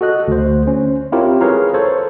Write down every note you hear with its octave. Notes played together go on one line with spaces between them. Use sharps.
F#4 A4 D#5 F#6
D2 C5
C#4 C5
C4 E4 F4 G4 A#4 C#5
G#4 A#4 B4 C#5 F5 A#5
A4 C5 C#5